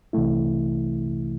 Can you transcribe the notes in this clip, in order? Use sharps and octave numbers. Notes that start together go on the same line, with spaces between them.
C2 C3 E3 A3 E4